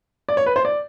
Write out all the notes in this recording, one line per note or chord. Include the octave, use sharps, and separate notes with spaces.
D5
C#5
B4
C5
D5